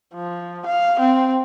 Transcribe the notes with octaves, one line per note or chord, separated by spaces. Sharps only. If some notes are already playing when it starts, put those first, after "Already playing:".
F3
F5
C4